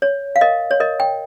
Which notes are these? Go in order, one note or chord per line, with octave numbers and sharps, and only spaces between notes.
C#5
F5
A#4 D#5
C#5
A#4 D#5
G5